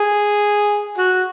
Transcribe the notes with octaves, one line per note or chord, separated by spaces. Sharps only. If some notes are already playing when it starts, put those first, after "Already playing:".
Already playing: G#4
F#4